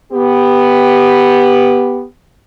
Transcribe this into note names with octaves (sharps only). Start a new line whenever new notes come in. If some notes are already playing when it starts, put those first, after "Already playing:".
B3 G4